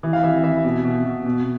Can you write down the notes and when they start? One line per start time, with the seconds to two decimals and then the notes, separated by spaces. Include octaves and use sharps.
0.03 E3
0.13 F5
0.23 E3 E5
0.43 E3 E5
0.64 B2
0.85 B2
1.05 B2
1.26 B2